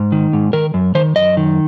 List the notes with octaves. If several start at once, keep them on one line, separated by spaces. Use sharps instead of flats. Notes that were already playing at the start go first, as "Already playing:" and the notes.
Already playing: G#2
D#3
G#2
D#3 A#4
F#2
D#3 C5
F#2 D#5
D#3